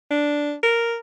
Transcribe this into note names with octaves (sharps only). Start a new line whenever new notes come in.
D4
A#4